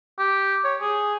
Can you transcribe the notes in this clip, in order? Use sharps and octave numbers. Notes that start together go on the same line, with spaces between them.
G4
C#5
G#4